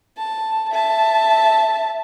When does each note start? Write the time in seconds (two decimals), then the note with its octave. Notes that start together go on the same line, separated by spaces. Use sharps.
0.18 A5
0.71 E5 A5